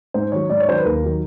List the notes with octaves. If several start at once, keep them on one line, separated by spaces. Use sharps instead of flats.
G#2 C5
D#3 F#3 C#5
G#2 D5
C#5
D#3 F#3 C5
B4
D#2 A#4
D#3 F#3